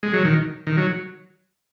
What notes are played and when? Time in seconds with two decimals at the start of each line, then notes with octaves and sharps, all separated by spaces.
0.03 G#3
0.14 F#3
0.25 D#3
0.67 D#3
0.77 F#3